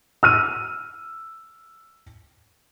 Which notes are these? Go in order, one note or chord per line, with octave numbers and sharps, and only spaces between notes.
E6 F6 D#7